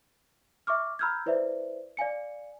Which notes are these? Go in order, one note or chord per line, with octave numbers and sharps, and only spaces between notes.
E5 C#6 D6 F6
A#5 B5 E6 F6 G6 G#6
E4 B4 C5 D5 E5
D5 F5 G#5 C#7